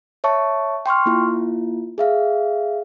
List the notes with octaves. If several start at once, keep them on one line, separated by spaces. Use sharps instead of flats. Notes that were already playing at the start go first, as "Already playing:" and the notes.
C#5 E5 A5 C#6
G5 C6 C#6 F6
A#3 E4 F4
G#4 E5 F5